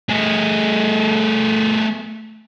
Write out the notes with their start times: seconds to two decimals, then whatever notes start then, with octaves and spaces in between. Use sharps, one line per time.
0.10 A3 G#4